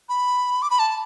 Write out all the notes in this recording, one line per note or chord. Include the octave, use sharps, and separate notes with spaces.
B5
D6
B5
A5